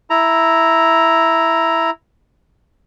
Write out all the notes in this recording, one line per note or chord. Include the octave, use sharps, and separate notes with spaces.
E4 A#5